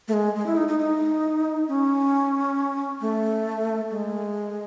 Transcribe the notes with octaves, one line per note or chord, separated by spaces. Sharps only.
A3
G#3
G#3
E4
D#4
D#4
D#4
C#4
A3
G#3